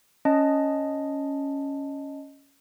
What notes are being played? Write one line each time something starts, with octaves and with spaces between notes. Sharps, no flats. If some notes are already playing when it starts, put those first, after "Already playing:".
C#4 D#5 A5